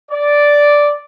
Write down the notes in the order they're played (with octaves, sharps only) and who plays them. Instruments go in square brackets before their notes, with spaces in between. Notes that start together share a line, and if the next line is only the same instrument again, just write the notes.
[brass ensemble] D5